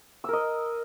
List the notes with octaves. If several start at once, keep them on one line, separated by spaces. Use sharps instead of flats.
A#4 D#5 E6